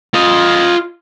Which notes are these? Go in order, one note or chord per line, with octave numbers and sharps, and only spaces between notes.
F4 D#5